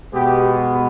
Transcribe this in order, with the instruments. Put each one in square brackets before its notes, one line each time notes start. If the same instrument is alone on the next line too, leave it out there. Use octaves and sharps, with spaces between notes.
[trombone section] B2 G#3 B3 G4